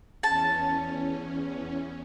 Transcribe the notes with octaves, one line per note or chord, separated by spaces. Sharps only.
E2 C#4 A5